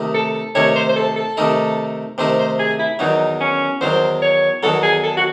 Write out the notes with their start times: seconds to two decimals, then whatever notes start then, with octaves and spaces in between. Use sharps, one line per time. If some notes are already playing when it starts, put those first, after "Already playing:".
Already playing: C3 D#3 A3 D#4
0.14 A4
0.55 C3 D#3 A3 D#4 C#5
0.76 C5
0.90 C5
0.96 A4
1.17 A4
1.37 C3 D#3 A3 D#4
2.18 C3 D#3 A3 D#4 C5
2.39 C5
2.59 G#4
2.79 E4
2.99 E2 D#3 F#3 D#4
3.40 C#4
3.81 E2 D#3 F#3 C5
4.22 C#5
4.63 E2 D#3 F#3 A4
4.83 G#4
5.04 A4
5.17 F#4